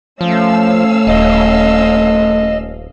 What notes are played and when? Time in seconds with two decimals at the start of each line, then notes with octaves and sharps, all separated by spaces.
0.21 F3 A3 C#4 F5 E6
1.07 D#1 D#5